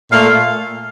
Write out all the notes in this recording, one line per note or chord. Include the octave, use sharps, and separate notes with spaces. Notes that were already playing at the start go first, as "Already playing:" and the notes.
A#2 A3 F5